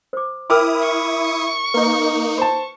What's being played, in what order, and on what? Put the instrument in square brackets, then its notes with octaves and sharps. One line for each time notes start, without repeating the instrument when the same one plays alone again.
[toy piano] C5 D6
[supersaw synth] E4 D#6 [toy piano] A#4 G5 [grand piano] D6 F6
[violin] C#6
[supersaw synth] A#3 D#4 [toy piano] B4
[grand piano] C5 A5